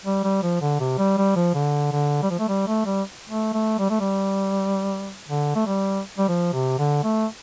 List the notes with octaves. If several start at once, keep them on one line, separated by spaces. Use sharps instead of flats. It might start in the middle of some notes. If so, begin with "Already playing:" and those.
G3
G3
F3
D3
C3
G3
G3
F3
D3
D3
G3
F3
A3
G3
A3
G3
A3
A3
G3
A3
G3
D3
A3
G3
G3
F3
C3
D3
A3